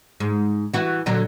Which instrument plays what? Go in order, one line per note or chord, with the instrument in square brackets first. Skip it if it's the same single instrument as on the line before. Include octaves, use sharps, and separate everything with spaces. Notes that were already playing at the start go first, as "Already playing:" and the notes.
[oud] G#2
E3 F#4
A#2 D3 F#3